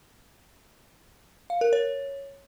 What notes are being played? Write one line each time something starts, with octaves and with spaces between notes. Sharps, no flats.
F5
A#4
C#5